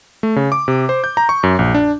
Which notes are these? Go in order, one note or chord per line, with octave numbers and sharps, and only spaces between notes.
A3
C#3
D6
C3
C5
G6
A#5
C#6
F#2
A#1
D4